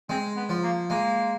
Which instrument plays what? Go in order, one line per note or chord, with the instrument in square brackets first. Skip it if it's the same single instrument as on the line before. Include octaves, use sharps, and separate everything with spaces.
[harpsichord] G#3 [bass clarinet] C4
[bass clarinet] B3
[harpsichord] F3
[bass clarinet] A#3
[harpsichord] G#3 [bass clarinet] A#3